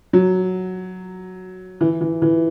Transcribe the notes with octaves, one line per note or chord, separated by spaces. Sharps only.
F#3
E3
E3
E3